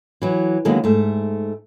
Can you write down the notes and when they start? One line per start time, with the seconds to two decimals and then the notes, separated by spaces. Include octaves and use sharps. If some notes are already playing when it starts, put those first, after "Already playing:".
0.22 E3 F#3
0.65 D3 D#3 F#3 G#3 A#3 B3
0.84 G#2 A3